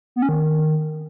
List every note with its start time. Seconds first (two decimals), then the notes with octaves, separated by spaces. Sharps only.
0.16 B3
0.22 C#4
0.29 D#3